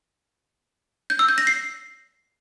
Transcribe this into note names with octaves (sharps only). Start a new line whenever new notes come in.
G6
E6
G6
A#6
C7